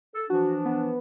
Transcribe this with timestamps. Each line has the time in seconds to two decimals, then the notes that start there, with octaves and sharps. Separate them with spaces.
0.15 A4
0.30 E3 F3 D4 F#4
0.66 B3